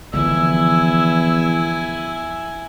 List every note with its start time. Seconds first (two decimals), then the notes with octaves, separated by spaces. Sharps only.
0.13 E2 D3 F3 E4 G#5 E6